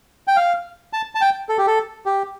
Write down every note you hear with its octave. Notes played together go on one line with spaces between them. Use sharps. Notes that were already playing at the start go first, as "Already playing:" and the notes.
G5
F5
A5
A5
G5
A4
G4
A4
G4